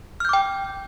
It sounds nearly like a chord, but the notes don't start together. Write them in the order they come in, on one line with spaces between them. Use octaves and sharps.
F6 G6 D6 G5